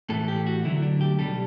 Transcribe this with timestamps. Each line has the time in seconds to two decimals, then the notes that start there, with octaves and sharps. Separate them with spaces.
0.10 A2 E3 A3 A4
0.28 G4
0.47 F#4
0.64 D2 D3 F#3 A3 E4
0.82 D4
1.01 G4
1.19 B1 B2 G3 A4